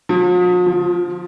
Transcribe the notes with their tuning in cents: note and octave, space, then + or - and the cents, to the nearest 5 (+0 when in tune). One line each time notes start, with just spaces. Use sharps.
F3 +45
F3 +5